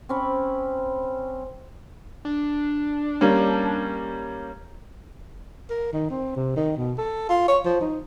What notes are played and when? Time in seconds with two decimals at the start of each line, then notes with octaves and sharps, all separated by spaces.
0.09 C4 C#4 B5
2.25 D4
3.21 G3 A#3 C#4
5.70 A#4
5.93 D#3
6.10 C4
6.36 C3
6.56 D#3
6.76 B2
6.98 A4
7.29 F4
7.48 C#5
7.65 F3
7.81 D#4